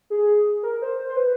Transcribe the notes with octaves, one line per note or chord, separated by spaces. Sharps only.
G#4
A#4
C5
C5
C5
B4